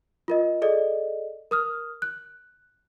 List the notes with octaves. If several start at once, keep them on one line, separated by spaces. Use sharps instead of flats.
F4 A#4 D#5
G#4 A4 D5 D#5
A#4 D#6 F6
F#6